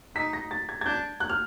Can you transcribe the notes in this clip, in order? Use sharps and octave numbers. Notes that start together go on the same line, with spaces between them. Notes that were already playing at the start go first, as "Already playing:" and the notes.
D#4 B6
A#6
A6
G#6
G#6
D4 G6
F#6
F6